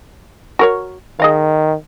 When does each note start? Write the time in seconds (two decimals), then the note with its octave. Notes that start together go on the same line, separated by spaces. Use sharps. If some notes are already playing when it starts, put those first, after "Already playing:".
0.59 F#4 A#4 C#5
1.20 D#3 G#4 D#5 F5